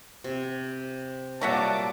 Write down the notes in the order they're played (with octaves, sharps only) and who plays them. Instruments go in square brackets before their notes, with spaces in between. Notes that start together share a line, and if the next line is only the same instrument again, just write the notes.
[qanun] C3
[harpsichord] A#2 G3 A#3 [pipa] F#3 E5 F#5 [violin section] A5 D6